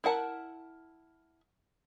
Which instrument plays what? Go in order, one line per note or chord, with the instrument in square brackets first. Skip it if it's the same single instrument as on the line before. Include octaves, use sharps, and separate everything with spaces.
[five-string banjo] E4 A#4 F#5 A5